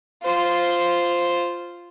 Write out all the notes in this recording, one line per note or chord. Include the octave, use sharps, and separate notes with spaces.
F4 C5